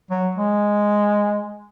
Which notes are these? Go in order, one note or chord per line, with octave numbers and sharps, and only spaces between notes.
F#3
G#3